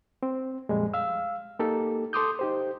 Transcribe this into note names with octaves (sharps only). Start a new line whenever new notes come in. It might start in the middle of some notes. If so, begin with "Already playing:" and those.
C4
F2 A#2 F3 G3 G#3
F5 E6
A#3 D#4 G4 A4
A4 C6 D6 D#6 G6
D#4 G4 C5